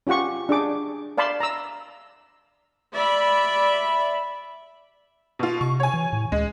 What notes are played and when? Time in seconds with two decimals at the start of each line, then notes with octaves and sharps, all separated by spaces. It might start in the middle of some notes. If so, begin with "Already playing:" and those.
0.07 C#4 F4 G4 F#5 C#6
0.49 D4 G#4 D6
1.18 D5 F5 A5 B5 C6
1.40 A#5 E6
2.94 D5 E5 B5
5.39 B2 F4
5.61 C3 C#6
5.80 C#5 G#5
5.94 E3
6.13 A2
6.32 D2 G#3